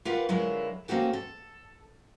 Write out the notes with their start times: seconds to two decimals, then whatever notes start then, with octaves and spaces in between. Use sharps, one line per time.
0.05 F4 G4 A#4 B4 F5 F#5
0.29 D3 F#3 G#3 E4 F4 A#4
0.88 A#3 C4 C#4 F#4 G4 A4
1.13 A4